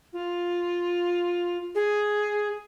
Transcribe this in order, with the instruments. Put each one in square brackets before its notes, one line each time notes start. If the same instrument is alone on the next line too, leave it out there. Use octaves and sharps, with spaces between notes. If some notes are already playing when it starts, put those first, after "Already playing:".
[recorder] F4
G#4